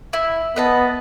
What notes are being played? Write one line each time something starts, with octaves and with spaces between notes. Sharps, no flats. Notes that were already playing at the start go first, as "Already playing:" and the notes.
E4
B3 B4 D#5 A5